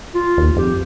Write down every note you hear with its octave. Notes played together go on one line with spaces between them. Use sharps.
F4
D#2
F2 G4